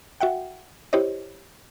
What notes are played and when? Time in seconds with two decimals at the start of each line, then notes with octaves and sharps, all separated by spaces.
0.21 F#4 E5 F#5 G5
0.93 E4 G4 C5 C#5 D#5